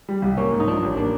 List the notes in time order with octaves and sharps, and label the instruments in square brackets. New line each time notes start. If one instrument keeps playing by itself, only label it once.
[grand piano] G3
C2
[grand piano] A#3 [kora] C#4
[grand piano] G#2
[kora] D#4
[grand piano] F3 [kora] D4
[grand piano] A1
[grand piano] A#3 [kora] D4